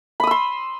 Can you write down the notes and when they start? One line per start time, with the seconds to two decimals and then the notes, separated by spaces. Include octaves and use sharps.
0.20 B5
0.23 D#6
0.27 E6
0.31 C6